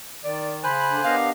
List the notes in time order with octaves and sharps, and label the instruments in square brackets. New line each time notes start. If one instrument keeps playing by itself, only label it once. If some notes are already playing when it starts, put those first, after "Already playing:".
[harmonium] D#3 [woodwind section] D5
[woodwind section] C#3 B5 [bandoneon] C5 G#5 F#6
[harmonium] D3 D4
[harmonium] B3 D4 G4 [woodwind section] A#4 D#5 [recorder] F5